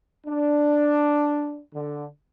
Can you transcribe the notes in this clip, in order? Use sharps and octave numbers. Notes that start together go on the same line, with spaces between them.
D4
D3